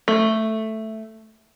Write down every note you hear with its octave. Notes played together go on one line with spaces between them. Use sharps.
A3